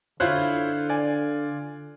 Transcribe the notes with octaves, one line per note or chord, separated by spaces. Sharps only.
D3 E4 F4 C5 C#5 F#6
D5 G#5